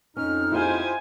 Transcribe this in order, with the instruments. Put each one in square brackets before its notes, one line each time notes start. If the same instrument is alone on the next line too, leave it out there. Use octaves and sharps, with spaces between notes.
[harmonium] F2 D#4 [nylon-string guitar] C#4 [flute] F6
[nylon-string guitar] E4 F4 G#4 [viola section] G4 C5 G#5